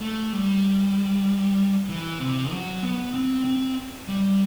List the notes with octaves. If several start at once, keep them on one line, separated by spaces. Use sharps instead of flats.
A3
G3
E3
C3
F#3
B3
C4
C4
G3